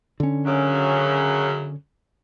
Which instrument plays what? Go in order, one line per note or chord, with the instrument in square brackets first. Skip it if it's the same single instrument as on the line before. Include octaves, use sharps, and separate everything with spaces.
[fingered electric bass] D3 C#4
[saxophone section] F#2 C#3